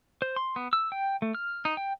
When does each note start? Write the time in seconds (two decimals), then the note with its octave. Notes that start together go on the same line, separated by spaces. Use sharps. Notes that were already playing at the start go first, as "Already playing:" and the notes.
0.22 C5
0.36 C6
0.56 B3
0.73 E6
0.92 G5
1.22 A3
1.35 F6
1.65 D#4
1.77 G5